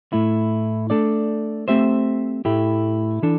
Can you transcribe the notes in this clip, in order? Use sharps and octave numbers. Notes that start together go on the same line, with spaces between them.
A2 A3 E4
A3 D4 A4 D5
A3 C4 G4 C5 E5
A2 A3 E4 G4
E3 D4 A4